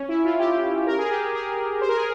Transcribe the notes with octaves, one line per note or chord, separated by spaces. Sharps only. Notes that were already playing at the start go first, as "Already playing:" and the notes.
Already playing: C#4
E4
F4
G4
A#4
G#4
G4
G#4
C5
A#4
G#4